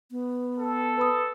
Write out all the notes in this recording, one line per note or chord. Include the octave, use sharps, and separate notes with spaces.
B3
A4
B4 B5 D#6